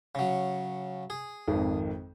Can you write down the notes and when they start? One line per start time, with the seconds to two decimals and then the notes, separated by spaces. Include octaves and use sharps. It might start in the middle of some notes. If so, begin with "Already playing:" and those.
0.15 C#3 F#3
1.10 G#4
1.48 G#1 F2 D#3